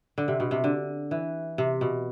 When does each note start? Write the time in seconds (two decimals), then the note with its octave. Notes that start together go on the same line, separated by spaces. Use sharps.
0.18 D3
0.28 C3
0.40 B2
0.51 C3
0.64 D3
1.11 E3
1.58 C3
1.81 B2